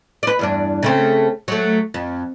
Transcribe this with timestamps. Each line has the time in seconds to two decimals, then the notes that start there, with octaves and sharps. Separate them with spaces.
0.23 B4 D5
0.39 E2 G2 D4
0.83 C#3 A3 C4
1.48 F#3 A3
1.94 F2